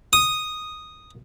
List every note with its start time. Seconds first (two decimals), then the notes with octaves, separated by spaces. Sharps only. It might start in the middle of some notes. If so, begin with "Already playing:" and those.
0.13 D#6